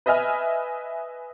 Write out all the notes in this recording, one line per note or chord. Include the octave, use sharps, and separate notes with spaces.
B4 D#5 E5 G#5 F6